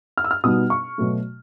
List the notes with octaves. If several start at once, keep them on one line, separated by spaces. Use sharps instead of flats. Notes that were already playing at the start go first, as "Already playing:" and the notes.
F6
E6
F6
B2 G3 B3 D#4 D#6
C#6
B2 F#3 A3